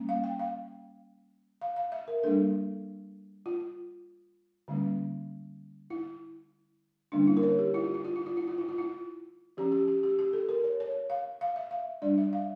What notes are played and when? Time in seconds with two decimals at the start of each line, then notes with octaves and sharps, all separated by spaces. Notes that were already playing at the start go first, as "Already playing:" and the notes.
Already playing: G3 A#3 C#4
0.09 F5
0.24 G5
0.39 F5
1.62 F5
1.76 F5
1.92 E5
2.08 A#4
2.23 G3 A#3 D4 A4
3.46 F4
4.68 D3 G3 A#3 C#4
5.90 E4
7.12 D3 G3 A#3 C#4 D4
7.27 E4
7.37 A#4
7.43 C#5
7.59 G4
7.74 E4
7.84 F4
7.94 E4
8.05 F4
8.16 E4
8.26 F4
8.37 E4
8.48 F4
8.58 E4
8.68 F4
8.78 E4
9.57 F3 C#4 G4
9.72 G4
9.88 G4
10.03 G4
10.19 G4
10.33 A4
10.49 A#4
10.64 C#5
10.80 C#5
11.10 F5
11.41 F5
11.56 E5
11.71 F5
12.02 G3 D4 D5
12.18 E5
12.33 F5